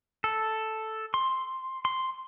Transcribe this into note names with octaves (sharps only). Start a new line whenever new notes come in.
A4
C6
C6